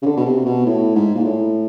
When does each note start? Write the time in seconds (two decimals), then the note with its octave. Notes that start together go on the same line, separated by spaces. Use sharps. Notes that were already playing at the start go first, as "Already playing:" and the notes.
0.02 C#3
0.06 D3
0.17 B2
0.26 C3
0.45 B2
0.66 A2
0.95 G#2
1.15 A#2
1.24 A2